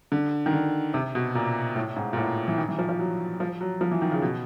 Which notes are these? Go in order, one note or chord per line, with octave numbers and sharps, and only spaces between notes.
D3
D#3
D3
C3
B2
A#2
A2
G#2
A#2
A2
E3
D#3
E3
F3
F3
F#3
F3
F#3
F3
E3
D#3
C#3
B2